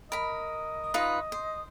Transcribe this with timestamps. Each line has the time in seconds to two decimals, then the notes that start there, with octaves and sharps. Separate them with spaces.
0.12 A#4 D#5 B5
0.94 D#4 F4 B4
1.32 C5